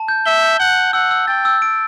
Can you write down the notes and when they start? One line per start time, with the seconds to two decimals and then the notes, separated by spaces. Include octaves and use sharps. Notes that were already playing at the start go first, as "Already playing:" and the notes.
Already playing: A5
0.08 G6
0.26 E5 G7
0.42 G6
0.60 F#5 G6
0.76 G6
0.93 F#5 E6
1.11 E6
1.27 G5 A6
1.45 E6
1.62 D7